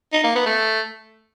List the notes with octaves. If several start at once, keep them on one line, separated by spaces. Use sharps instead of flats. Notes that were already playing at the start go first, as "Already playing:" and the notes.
D#4
A#3
B3
A3